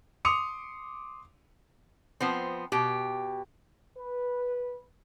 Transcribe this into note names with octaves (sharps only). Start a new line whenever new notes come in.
C6 D6 D#6 C#7 F7
F3 B3 C4
B2 G4
B4